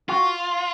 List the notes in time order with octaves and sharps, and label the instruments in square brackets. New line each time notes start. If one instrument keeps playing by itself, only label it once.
[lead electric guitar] F4 [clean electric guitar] F#4